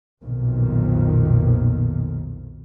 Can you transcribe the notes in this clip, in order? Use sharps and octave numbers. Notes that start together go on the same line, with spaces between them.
B1 F2 A#2 D#3